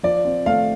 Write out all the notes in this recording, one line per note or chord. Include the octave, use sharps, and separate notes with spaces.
F3 D5
C4
A3 F5